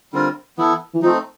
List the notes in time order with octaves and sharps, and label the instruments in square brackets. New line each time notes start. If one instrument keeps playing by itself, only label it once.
[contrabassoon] D3 [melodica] G3 C4 F4 A#4
[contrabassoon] E3 [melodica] B3 E4 A4
[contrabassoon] E3
[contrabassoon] F3 [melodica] A3 C4 D#4